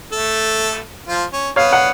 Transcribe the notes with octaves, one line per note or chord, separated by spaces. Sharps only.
A3 A4
F3 F4
C#4
B3 C#5 F5
F#5